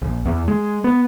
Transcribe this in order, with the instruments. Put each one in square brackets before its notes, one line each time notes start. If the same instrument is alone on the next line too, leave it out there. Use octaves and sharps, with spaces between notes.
[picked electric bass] A#1
E2
G#3
B3